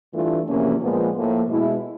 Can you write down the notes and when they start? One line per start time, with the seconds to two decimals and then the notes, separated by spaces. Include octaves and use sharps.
0.14 G2 E3 A3 D4 F4
0.47 E2 C3 F3 A#3 C#4
0.81 A#2 F3 G#3 B3
1.16 A2 F3 A#3
1.48 B2 G#3 B3 E4